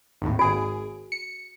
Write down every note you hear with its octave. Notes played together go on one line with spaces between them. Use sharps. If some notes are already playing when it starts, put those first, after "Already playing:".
G#1 D#2 A2
G#1 F#4 G#4 D7
C#7